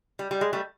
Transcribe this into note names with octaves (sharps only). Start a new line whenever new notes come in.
G3
G3
G#3
G3 A3